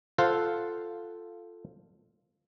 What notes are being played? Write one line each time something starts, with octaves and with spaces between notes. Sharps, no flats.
F4 A4 C5 F5 F#5